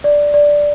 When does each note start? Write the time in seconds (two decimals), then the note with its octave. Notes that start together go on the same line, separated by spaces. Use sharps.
0.04 D5
0.34 D5